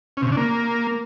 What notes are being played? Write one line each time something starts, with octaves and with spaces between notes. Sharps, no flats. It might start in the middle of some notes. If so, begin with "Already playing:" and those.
C#4
C3
C#3
D4
A#3